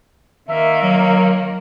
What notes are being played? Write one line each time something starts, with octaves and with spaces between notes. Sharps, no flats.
D#3 A#3 E5
F#3